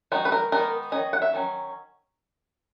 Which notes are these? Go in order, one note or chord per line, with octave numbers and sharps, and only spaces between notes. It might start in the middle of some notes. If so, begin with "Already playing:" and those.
D#3 G#3 B3 D#4 F#4
B4
A#4
D#3 G#3 B3 D#4 A#4
D#3 F#3 C#4 D#5
F#5
E5
D#3 F#3 C#4